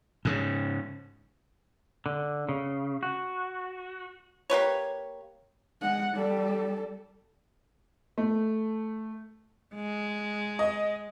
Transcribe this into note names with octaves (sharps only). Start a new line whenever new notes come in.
G#2 C#3
D3
C#3
F#4
A#3 G4 B4 C#5
G#3 F#5
G3 A4
A3
G#3
D#5